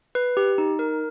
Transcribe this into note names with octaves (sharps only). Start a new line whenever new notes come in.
B4
G4
D#4
A#4